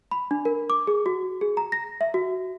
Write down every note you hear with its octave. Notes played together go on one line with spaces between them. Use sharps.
B5
D4
A#4
D6
G#4
F#4
G#4
A#5
A#6
E5
F#4